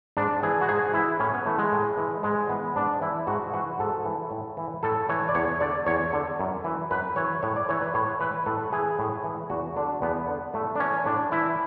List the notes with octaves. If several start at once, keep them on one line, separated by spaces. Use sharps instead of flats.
G#2 D4
E3 G#4
F#4
G#2 G#4
E3 E4
A2 C#4
B3
E3 A3
G#3
A2
E3
G#2 G#3
E3 B3
G#2 D4
E3 E4
G#2 F#4
E3 F#4
G#2 A4
E3
A2
E3
A2 A4
E3 C#5
D5
E2 C#5
D3 D5
E2 C#5
D3
F#2
E3
F#2 B4
E3 C#5
A2 C#5
D5
E3 C#5
B4
A2 C#5
E3 B4
A2 A4
E3 G#4
A2
E3
E2 F#4
D3 D4
E2 B3
D3
A2 A3
D4
E3 C#4
A2 D4
E3 E4